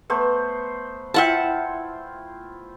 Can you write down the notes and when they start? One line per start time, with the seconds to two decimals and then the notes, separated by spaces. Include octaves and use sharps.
0.10 A3 B3 C5
1.14 E4 F4 E5 F#5 G5 A5